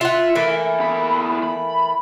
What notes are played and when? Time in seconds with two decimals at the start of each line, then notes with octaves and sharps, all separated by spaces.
0.01 F4 E5 F#5
0.35 E3 A3 A#3
0.80 E2 B5
1.43 B5